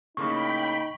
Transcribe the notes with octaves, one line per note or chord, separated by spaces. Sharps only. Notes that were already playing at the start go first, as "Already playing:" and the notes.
A2 C#3 A#3 D#4 G5 B5 C#6 B6